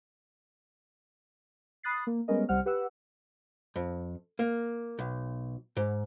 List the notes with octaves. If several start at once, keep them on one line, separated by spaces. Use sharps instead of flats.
B5 D#6 F#6 A6 C7
A#3
G3 G#3 B3 C#4 A#4 D#5
C2 G3 C5 F#5 F6
G4 B4 F#5 E6
F2
A#3
B1
G#2